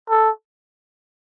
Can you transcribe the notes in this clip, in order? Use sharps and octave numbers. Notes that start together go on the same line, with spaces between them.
A4